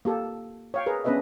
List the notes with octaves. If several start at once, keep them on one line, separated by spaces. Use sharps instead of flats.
A#3 G4 A4
C#5 F5 G5
G#4 A#4 B4
B3 C#4 D4 B4 D#5 E5